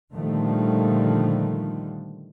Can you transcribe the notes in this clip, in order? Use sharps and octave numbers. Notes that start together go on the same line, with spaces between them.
A#2 D3 D#3 F3 G3 A3